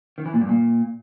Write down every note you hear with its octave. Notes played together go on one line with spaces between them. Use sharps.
D#3
E3
A#2
G2
A#2